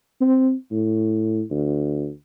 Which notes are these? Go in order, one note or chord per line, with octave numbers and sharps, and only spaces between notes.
C4
A2
D2